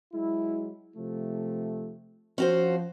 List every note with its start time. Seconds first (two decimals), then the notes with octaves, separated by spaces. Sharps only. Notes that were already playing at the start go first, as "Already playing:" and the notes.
0.13 F#3 G#3 E4
0.95 C3 F3 A3
2.38 F3 C#4 F#4 C5